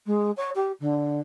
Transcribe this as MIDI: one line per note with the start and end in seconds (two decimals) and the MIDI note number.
0.06 0.31 56
0.37 0.50 73
0.55 0.72 67
0.80 1.20 50